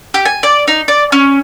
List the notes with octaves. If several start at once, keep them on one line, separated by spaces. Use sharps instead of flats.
G4
G#5
D5
D#4
D5
C#4